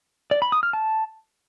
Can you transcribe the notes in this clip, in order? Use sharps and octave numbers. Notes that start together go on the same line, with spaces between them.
D5
B5
D#6
F6
A5